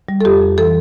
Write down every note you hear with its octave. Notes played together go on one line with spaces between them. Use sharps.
G3
A4
F2 G4
F2
E3 A4